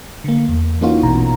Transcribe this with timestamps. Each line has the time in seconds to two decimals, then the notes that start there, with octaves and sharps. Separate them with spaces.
0.24 D3 A#3
0.48 E2
0.81 E3 A#3 C#4 D#4 F4 F#4
1.03 A#1 B2 A#5